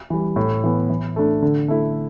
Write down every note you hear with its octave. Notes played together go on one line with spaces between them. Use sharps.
E3 G3
A2
E3 B3
E3
A3 D4
D3
A3 E4